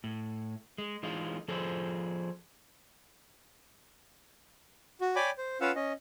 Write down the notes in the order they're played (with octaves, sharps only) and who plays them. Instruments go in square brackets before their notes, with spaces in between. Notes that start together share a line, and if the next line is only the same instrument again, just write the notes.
[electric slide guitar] A2
G#3
E3 G#3 D#4 F4
F3 F4 G#4 A4 C5
[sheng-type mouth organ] F#4
C#5 D5 G5 G#5 B5 D6
C5
C#4 F4 B4 F5 F#5 E6
C#4 D#5